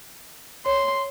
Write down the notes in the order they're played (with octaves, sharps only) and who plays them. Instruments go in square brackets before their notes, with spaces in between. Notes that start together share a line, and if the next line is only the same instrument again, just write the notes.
[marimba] C#5 [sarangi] C6